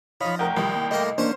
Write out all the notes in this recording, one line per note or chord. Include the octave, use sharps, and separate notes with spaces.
F3 D#4 C#5 F5 B5
F1 A#4 F#5 G5
C2 D#3 F3 G3
A#3
A3 A#3 A#4 D#5
A#3 C#4 D4 C5 F#5 C#6